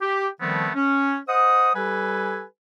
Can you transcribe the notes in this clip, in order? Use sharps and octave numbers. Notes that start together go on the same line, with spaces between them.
G4
D#3 F3 G3 A3 B3 C4
C#4
C5 D#5 F#5 D#6
G3 G4 A4 B4 G#5